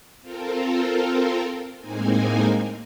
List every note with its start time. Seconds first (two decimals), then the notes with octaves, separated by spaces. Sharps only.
0.21 C4 F4 A4 A#4
1.79 A2 G#3 A#3 C4 D#4 G#5